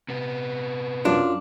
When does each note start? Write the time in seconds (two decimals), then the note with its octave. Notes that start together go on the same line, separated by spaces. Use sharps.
0.09 C3 B3
1.05 F#2 D4 F4